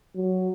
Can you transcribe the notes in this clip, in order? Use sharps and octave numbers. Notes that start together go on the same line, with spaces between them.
F#3